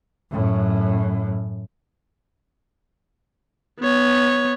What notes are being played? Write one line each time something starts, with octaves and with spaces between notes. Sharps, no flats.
F#2 A2
B3 C#5